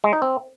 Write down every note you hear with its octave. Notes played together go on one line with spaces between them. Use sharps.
G#3
D#4
C4